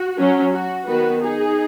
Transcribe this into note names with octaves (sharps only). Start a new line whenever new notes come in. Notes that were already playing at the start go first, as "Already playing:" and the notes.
Already playing: F#4
F#3 C#4
F#4
D#3 B3 F#4 B4
D#4 G#4